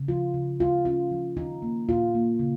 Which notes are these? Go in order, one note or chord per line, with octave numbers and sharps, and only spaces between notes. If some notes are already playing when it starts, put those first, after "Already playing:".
Already playing: C#3
F3 F4
C#3
G#3 F4
C#4 F4
F3
D#3 D#4
A#3
A#2 F4
A#3
C#3